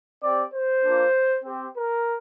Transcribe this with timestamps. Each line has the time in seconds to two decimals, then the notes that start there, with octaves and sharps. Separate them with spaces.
0.22 C4 G4 D5
0.53 C5
0.83 A#3 D4 F4
1.44 C4 G4
1.75 A#4